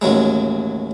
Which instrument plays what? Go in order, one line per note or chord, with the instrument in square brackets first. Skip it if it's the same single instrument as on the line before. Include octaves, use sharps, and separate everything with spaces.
[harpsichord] A1 D#2 F#3 G#3